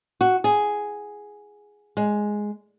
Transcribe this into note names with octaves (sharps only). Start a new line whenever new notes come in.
F#4
G#4
G#3